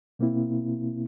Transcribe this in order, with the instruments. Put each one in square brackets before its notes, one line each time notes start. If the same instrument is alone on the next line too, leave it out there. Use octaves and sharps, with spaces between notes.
[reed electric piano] B2 A#3 C4 E4